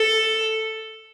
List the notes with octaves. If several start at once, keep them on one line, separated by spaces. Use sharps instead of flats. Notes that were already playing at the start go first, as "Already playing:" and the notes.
Already playing: A4